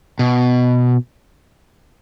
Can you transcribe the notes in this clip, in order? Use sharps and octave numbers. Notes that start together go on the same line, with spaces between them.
B2